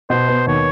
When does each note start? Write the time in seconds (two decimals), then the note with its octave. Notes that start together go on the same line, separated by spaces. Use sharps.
0.10 B2 C5
0.28 B3
0.47 D#2 C#5